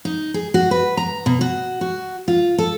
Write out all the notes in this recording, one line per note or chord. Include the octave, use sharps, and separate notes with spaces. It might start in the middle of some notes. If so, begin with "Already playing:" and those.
D#4
G#4
F#4
B4
A#5
B2
F#4
F#4
F4
A4